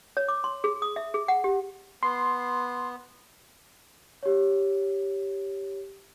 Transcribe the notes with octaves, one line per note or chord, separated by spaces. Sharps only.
C#5
D6
C6
G#4
D#6
E5
G#4
F#5
G4
B3 C6
G4 C#5